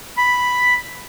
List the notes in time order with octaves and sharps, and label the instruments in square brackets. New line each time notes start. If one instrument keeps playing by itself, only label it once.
[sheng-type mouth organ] B5